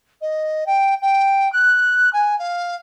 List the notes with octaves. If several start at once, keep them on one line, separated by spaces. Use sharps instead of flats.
D#5
G5
G5
F#6
G#5
F5